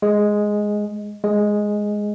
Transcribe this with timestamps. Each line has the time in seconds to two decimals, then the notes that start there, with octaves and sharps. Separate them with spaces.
0.02 G#3
1.24 G#3